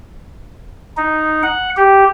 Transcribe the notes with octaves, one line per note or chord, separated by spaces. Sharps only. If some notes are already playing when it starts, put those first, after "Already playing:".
D#4
F#5
G4